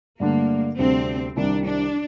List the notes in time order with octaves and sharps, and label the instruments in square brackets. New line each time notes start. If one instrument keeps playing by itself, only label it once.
[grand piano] G2 D3 A3 D4 [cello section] A#3
[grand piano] D2 C3 G3 D4 [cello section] C4
[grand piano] C2 C3 D#3 G3 C4 [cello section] D4
[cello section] D4